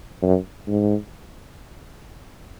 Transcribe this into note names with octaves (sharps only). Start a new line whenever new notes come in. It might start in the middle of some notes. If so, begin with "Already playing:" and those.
F#2
G#2